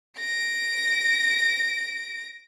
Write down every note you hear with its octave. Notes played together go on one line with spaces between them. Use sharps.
A#6 D7